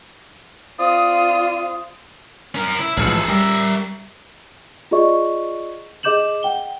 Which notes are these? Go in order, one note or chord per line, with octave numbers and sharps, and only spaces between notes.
C4 F4 D5 D#6
C#4 A#4
E4
A1 G#2 F3 G#4 A4
G3 A#4 E5
F4 G#4 D5 D#5 C#6
G#4 D#5 D6 G6 E7 F#7
F#5 G5 G7